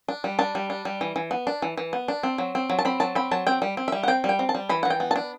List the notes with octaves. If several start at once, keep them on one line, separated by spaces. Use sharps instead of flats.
D4
G3
D4 A5
G3
D4
G3
E3
E3
B3
D4
E3
E3
B3
D4
C4
F#3
C4
F#3
A5
C4 B5
F#3 A5
C4 B5
F#3 A5
C4 G5
G3
C4
G3 E5
F#5
C4 G5
G3
G5
C4
A5
G3
E3 B5
E3 F#5
G5
B3
A5
D4